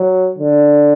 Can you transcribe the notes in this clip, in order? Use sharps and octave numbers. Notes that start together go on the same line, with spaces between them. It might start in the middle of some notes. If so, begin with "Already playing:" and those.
Already playing: F#3
D3